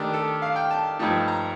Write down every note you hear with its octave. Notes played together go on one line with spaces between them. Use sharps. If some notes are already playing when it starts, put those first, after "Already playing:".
Already playing: D#3 A3 D4 G4
A4
F5
G5
A5
G2 F3 A3 D#4
A#5